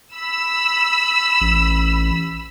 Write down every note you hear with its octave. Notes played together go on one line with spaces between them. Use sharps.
B5 E6
A1